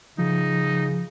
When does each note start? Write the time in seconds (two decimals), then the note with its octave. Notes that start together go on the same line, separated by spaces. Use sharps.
0.19 C#3 F3 D#4